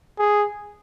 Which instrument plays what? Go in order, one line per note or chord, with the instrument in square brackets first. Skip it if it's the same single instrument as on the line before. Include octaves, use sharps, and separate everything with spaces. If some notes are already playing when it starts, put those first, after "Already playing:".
[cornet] G#4